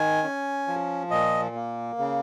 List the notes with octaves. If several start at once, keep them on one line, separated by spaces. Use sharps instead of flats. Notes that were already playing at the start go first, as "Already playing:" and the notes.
Already playing: D#3 G#5
C#4
F3
A#2 D#5
A#3
C#3